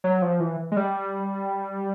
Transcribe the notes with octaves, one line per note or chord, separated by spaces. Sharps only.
F#3
F3
E3
G#3
G3